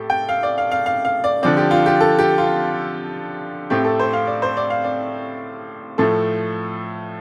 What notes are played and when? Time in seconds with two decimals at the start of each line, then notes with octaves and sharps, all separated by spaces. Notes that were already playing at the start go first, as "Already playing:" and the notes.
Already playing: A2 G4 A4
0.10 G5
0.29 F5
0.43 D5
0.58 F5
0.71 F5
0.86 F5
1.05 F5
1.24 D5
1.43 D3 F3 C4 D5
1.57 G4
1.71 F4
1.86 G4
2.01 A4
2.19 G4
2.38 F4
3.70 A2 A3 C4 G4
3.85 A4
3.99 C5
4.13 F5
4.27 D5
4.42 C5
4.57 D5
4.70 F5
4.84 D5
5.98 A2 F3 A3 A4